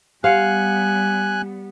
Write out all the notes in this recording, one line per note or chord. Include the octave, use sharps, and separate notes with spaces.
G3 B3 G4 F5 F#5 G#5 F#6 C#7